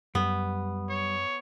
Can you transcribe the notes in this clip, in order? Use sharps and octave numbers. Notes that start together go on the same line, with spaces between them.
F#2 G3 B3
C#5